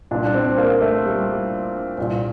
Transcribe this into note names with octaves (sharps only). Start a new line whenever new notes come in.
C2 A#2 D4
D4
C4
A#3
A3
G3
C2 A#2